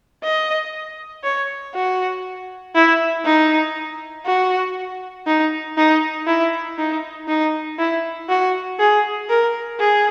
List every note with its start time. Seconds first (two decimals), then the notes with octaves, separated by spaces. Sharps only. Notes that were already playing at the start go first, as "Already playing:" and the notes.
0.23 D#5
1.24 C#5
1.75 F#4
2.75 E4
3.25 D#4
4.26 F#4
5.27 D#4
5.77 D#4
6.27 E4
6.78 D#4
7.28 D#4
7.79 E4
8.29 F#4
8.79 G#4
9.29 A#4
9.80 G#4